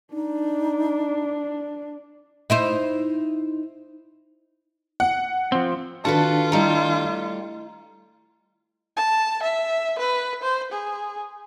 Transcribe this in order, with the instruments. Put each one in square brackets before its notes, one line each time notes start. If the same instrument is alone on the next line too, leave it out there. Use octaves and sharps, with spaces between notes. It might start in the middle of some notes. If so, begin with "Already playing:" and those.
[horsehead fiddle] D4 [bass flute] D#4
[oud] D#4 E4 C5
[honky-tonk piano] F#5
[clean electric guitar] F3 C4
[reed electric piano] D#3 D4 A5 [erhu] F4 [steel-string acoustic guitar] F#4 A4 B4
[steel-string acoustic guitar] G3 A3 [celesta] E4 D#5 A#5
[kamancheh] A5
E5
B4
C5
G#4